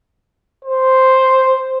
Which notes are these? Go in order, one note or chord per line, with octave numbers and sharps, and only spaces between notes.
C5